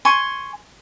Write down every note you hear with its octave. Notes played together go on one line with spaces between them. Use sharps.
G#5 C6 C#6